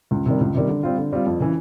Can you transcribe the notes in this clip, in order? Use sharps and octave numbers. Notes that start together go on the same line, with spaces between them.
C#2
C3 D#3 G3
C#2
C3 D#3 G3
D3
G3 C4 F4
D3
G3 C4 F4
F2
C#3 E3